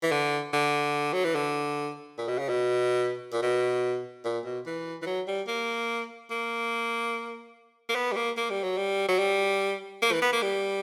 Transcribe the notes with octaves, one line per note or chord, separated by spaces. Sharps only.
E3
D3
D3
F#3
E3
D3
A#2
B2
C#3
B2
A#2
B2
A#2
B2
E3
E3
F#3
G3
A#3
A#3
A#3
B3
G3
A#3
A#3
G3
F#3
G3
F#3
G3
A#3
E3
B3
A#3
G3